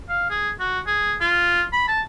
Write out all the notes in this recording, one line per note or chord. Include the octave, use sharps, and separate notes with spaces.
F5
G#4
F#4
G#4
F4
B5
A5